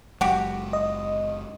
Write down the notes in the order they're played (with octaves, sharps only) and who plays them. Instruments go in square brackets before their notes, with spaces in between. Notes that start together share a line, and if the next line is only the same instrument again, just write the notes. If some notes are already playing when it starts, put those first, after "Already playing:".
[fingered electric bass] F#1 F#3 G#3 [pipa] F#4 G4
[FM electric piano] D#5